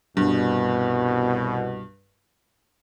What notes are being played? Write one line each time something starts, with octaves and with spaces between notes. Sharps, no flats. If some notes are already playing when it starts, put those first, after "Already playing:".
C2 G2 B2